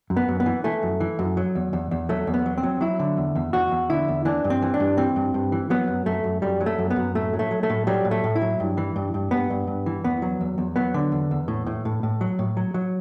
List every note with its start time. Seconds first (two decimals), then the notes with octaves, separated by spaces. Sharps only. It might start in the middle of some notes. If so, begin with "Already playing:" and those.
0.10 F#2
0.17 B3
0.28 F#2
0.40 B3
0.46 E3
0.64 E3 A3
0.83 F#2
1.00 E3
1.19 F#2
1.37 F#3
1.55 E2
1.73 E2
1.91 E2
2.09 F#3 A3
2.27 E2
2.34 B3
2.46 F#3
2.58 C4
2.63 F#3
2.81 F#3 E4
2.99 D3
3.17 E2
3.36 E2
3.53 E2 F#4
3.72 E2
3.90 D3 E4
4.08 E2
4.25 E3 D4
4.44 G2
4.50 C4
4.62 E3
4.74 D4
4.80 G2
4.97 E3 C4
5.16 G2
5.34 G2
5.52 E3
5.70 F#3 B3
5.88 F#2
6.06 F#2 A3
6.24 F#2
6.42 F#2 G3
6.61 F#3
6.66 A3
6.79 F#2
6.90 B3
6.96 F#2
7.15 A2 A3
7.33 F#3
7.39 A3
7.51 F#3
7.63 A3
7.70 A2
7.87 F#3 G3
8.05 A2
8.11 A3
8.24 A2
8.35 E4
8.42 F#3
8.60 G2
8.78 E3
8.96 G2
9.14 G2
9.31 G2 B3
9.50 G2
9.67 G2
9.86 E3
10.04 E2 B3
10.22 F#3
10.41 E2
10.58 E2
10.76 F#3 B3
10.94 D3
11.12 E2
11.31 E2
11.48 A2
11.67 A2
11.85 A2
12.03 A2
12.21 F#3
12.39 A2
12.57 F#3
12.74 F#3